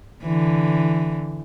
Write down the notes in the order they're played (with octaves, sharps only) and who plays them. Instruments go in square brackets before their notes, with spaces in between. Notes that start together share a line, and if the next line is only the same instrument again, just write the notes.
[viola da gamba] D3 E3